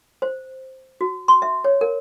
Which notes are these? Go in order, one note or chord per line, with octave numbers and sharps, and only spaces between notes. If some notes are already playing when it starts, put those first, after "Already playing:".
C5
F#4
C6
E5
C#5
A#4